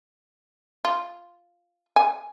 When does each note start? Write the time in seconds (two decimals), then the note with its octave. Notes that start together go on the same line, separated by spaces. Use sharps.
0.85 F4
1.96 G#5